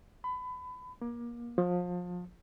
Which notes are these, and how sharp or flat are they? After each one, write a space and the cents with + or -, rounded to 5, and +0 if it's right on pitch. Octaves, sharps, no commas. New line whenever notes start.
B5 +25
A#3 +30
F3 +30